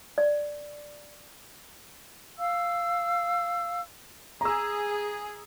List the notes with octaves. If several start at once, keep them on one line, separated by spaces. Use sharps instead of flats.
D5
F5 E6
G#4 A#5 E6